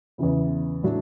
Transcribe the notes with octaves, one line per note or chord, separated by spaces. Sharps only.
E2 C#3 E3 B3
A2 F#3 A3 D4